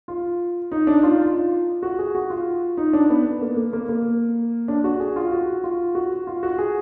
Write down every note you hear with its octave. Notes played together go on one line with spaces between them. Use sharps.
F4
D#4
D4
F4
D#4
F4
F#4
G#4
F#4
F4
D#4
D4
B3
B3
A#3
A#3
A#3
A#3
D4
F#4
G#4
F4
F#4
F4
F#4
F4
F#4
G#4